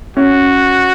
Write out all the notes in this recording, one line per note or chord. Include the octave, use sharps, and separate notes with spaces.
C#4 F#4